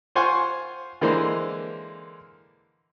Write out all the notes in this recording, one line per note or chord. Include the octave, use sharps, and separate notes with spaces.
F4 C5 F#5 G#5 C6 C#6
D3 E3 G#3 A#3 A#4 C5